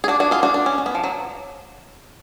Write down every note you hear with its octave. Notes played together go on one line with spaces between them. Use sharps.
G#4
D4 F#4
D4 F#4
F4 G#4
D4 F#4
D4
C#4
C#4
B3
F3
F#3